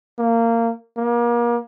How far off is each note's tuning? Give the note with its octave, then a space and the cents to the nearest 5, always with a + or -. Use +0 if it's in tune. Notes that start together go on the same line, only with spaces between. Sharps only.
A#3 -20
A#3 +35